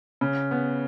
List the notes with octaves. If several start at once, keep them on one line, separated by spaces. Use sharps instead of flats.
C#3
B3